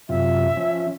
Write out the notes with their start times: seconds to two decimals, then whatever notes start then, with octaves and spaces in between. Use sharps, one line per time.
0.09 F#2 C3 F4 E5
0.57 F3 C#4